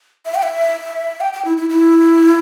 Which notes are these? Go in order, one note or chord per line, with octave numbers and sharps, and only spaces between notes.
E5
G5
E5
G5
G5
E4
E4
E4